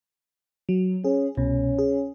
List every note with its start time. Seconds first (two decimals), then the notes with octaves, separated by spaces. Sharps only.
0.69 F#3
1.04 C#4 G#4
1.37 C2 B2 C#4
1.79 G#4